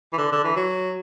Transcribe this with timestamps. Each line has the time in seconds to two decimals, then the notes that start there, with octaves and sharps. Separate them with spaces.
0.13 E3
0.17 D3
0.32 D3
0.44 E3
0.56 F#3